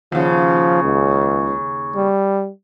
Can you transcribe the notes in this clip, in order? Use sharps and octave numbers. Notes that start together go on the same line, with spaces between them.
D#2 C#3 F3
C#2
G3